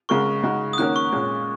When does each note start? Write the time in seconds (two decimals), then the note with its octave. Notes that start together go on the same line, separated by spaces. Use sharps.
0.09 C#3 G#3 F#4 A#4 C#6
0.43 C#3 G#3 D#4 F#4
0.73 D#6
0.78 D#3 A#3 C#4 F#4 A#4 F#6
0.96 C#6
1.13 A#2 G#3 C#4